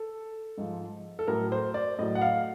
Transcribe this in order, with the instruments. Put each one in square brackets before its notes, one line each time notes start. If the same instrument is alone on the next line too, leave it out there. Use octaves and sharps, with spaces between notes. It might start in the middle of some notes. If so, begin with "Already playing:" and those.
Already playing: [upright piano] A4
G#2 F3
A4
A2 F#3 A#4
C5
D5
A2 F#3 D#5
F#5
F5